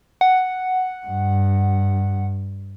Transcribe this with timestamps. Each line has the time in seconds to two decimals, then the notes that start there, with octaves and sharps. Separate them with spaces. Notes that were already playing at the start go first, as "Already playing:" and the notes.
0.21 F#5
1.06 G2